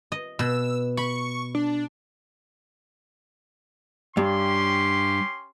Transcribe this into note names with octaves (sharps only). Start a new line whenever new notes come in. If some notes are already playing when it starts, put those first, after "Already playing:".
D#5
B2 E6
B5 C#6
D4
G2 C#4 G4 C6